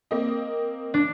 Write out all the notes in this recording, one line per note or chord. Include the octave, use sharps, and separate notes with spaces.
A#3 C4 D#5
D4